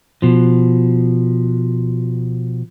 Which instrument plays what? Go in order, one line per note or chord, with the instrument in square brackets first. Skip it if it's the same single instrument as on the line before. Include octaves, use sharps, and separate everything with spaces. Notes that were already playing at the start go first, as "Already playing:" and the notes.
[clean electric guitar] B2 F3